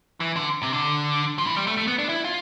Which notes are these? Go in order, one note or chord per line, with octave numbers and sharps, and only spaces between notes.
E3
D3
C3
D3
F3
E3
G3
A3
A3
B3
D4
E4
F4